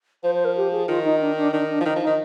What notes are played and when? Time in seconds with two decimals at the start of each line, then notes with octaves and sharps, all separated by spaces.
0.23 F3 C5
0.35 C5
0.45 A#4
0.57 G4
0.72 G#4
0.88 D#3 F4
1.04 D#4
1.21 D4
1.37 D4
1.53 D#3 D4
1.70 D4
1.80 F3
1.85 D#3 D#4
1.96 F3
2.02 D#3 D#4